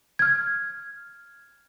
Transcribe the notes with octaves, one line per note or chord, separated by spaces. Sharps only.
F6 G#6